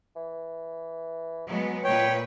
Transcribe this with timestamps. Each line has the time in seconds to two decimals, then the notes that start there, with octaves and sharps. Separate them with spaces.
0.16 E3
1.47 B2 F#3 G#3 B3
1.84 A#2 B4 C#5 G5